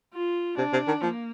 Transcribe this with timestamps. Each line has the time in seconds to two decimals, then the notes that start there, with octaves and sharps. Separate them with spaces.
0.14 F4
0.58 C3 D4
0.73 C3
0.88 D#3
1.02 F3 A#3